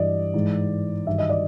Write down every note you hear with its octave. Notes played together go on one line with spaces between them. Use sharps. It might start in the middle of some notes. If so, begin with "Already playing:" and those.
Already playing: G2 E3 D5 D#5
G#2 E3
G2 D#3 F#3 E5
D#5
D5